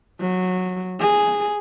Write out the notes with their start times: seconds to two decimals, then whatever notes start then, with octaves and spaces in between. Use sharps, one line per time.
0.20 F#3
0.99 G#4